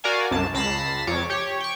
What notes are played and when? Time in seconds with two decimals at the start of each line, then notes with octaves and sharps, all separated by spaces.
0.04 F#4 A#4 D5 F5 G#5
0.31 C2 F#2 A5
0.54 C#2 A5 B5 A#6 C7 E7
1.07 F2 C#5 D6
1.30 G4 C#5
1.60 G5 C#6